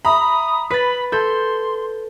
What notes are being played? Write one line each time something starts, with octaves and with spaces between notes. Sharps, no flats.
E5 A#5 B5 D#6
B4 B5 A6 B6
A4 C6 G6